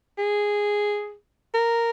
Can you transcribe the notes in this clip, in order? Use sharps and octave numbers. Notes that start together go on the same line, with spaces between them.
G#4
A#4